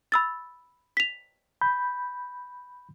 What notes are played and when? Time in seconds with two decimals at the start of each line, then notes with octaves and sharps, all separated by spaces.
0.12 B5 E6 A6
0.97 B6 F7
1.61 B5 G6